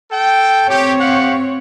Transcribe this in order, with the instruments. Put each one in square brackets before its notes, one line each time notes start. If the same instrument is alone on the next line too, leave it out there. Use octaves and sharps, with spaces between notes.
[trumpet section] A4 G5
[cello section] C4 C#5 [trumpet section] G4
[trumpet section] G4 F5 F#5